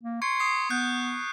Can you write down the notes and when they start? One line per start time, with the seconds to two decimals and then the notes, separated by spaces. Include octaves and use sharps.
0.03 A#3
0.22 C6 C#6 G#6 C#7
0.40 C#6 D#6 C7
0.70 B3 F#6 G6